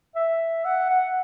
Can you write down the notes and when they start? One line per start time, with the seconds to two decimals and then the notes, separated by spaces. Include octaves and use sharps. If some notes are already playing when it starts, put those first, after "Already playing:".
0.15 E5
0.65 F#5
0.90 F#5